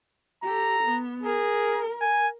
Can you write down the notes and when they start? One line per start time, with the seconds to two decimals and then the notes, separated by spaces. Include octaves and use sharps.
0.43 G4 A4 A#5
0.83 B3
1.23 G#4 A#4
2.01 G#5